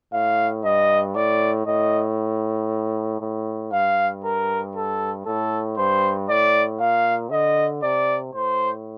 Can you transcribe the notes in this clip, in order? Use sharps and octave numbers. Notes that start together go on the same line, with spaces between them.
A2 F5
G2 D#5
A2 D5
A2 D#5
A2
G2 F5
A#4
A4
A2 A4
G2 C5
A2 D5
A#2 F5
D3 D#5
C3 D5
A2 C5